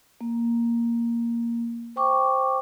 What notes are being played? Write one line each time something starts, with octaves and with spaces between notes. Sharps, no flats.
A#3
C5 G5 C#6 D6